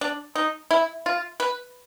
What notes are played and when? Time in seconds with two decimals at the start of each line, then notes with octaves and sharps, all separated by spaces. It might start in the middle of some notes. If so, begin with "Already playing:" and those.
0.01 D4
0.35 D#4
0.71 E4
1.06 F4
1.40 B4